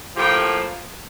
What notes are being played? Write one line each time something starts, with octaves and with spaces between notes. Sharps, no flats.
A2 F3 A#3 G4 G5